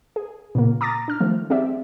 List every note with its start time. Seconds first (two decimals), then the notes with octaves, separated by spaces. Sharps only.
0.16 G#4
0.55 A#2 C#3 A#3
0.81 A#5 D6 D#6 A6 A#6
1.08 D4 F6
1.20 D#3 F3 G3 A3
1.50 C4 G4 G#4 D5 E5